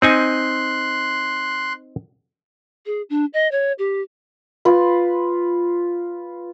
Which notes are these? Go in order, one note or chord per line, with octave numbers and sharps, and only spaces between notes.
C4 D#4 G#5 C6 F#6
G#4
D4
D#5
C#5
G4
F4 B4